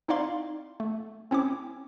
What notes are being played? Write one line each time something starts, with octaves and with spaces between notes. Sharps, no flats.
C4 D#4 E4 D5 F5 C6
A3
C4 C#4 E4 D6